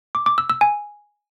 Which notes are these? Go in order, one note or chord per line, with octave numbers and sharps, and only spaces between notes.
D6
D6
E6
E6
G#5